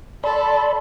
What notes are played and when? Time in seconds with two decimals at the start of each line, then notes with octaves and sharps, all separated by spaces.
0.24 A4 D5 B5 C6